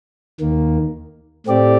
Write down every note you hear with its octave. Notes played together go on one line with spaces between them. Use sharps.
D#2 D#3 A#3
A2 A3 C4 G4 D5